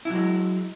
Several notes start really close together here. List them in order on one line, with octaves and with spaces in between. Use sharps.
E4 F#3 G#3